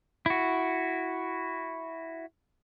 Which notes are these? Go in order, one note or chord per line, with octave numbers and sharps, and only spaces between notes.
E4 F#4